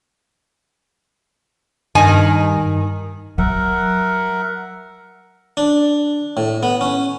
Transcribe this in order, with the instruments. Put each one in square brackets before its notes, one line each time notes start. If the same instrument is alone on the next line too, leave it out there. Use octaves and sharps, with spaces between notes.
[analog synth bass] G2 [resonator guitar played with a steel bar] D#3 G#5
[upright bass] F#3 [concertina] A#4 E5 F#5
[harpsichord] D4
A2
B3
C#4